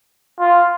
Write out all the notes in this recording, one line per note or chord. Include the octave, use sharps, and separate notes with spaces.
F4